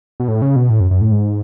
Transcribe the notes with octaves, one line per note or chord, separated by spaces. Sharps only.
B2
A2
C#3
B2
A2
F#2
F#2
A2
G#2